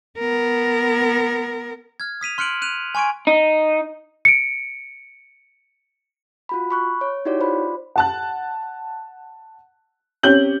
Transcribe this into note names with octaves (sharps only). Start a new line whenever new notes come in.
B3 A#4
F6 G#6
D#6 B6 D#7 F7
C6 F6 F#6 C#7 D7 F#7
F#6 D#7 F7
G#5 C6 C#6 G#6 D7
D#4
C#7 D7
F4 F#4 B5
B5 C#6 F#6
C#5
D#4 E4 F#4 G4 C#5 D5
F4 C5 D5 B5
F#5 A5 F#6
C4 C#4 G4 G6 F#7